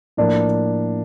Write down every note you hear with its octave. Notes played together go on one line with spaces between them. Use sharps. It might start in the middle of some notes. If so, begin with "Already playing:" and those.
A2 F3 A#3 D4